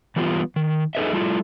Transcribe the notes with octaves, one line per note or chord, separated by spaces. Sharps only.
E3 G3 B3 F4
D#3
D#4 G#4 A4 B4 D#5 E5
G3 A3 E4 F4